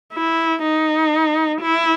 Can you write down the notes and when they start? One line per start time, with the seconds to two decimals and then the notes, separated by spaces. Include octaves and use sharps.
0.13 E4
0.63 D#4
1.61 E4